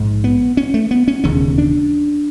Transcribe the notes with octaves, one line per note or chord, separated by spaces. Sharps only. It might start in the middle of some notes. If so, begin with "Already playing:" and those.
Already playing: A#1 G#2
B3
C#4
A3
B3
C#4
E1 D#2 C#3 C#4
D4